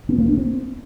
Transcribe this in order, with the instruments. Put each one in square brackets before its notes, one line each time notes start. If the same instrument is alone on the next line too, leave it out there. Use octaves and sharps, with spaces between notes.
[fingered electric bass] B3
A#3
D4
C4